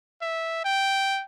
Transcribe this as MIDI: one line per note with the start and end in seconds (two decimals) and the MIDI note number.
0.22 0.63 76
0.65 1.23 79